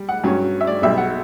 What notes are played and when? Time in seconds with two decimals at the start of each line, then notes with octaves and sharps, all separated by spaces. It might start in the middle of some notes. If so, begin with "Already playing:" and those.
Already playing: G3
0.09 F#5
0.24 G2 F#3 C#4
0.61 E5
0.67 D5
0.82 B1 B2 G3 E5
0.98 F#5